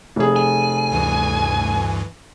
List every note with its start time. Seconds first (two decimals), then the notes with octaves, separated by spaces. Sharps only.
0.16 F1 G#4
0.36 G#5
0.91 D2 G2 E3